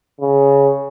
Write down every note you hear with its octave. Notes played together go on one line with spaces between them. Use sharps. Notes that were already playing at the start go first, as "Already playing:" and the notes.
C#3